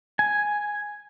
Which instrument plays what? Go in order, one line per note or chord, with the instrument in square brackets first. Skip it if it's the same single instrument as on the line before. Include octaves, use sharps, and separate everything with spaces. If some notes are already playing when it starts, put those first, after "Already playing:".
[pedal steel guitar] G#5